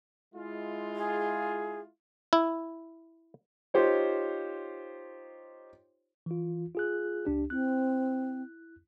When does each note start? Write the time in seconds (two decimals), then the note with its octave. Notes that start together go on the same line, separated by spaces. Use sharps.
0.35 G#3 E4 F4
0.96 G#4
2.33 E4
3.74 D#4 F4 G4 C5 C#5
6.26 E3 F4
6.75 F4 G#4 F#6
7.25 C#2 D4 G4
7.50 C4 E4 F#6